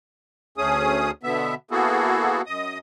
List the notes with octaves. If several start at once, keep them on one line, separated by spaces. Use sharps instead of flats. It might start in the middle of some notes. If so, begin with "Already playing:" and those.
D2 A3 C#4 G#4 D#6
B2 D3 B3 E5
A#3 B3 E4 F#4 G#4 A4
F#2 D#5 D#6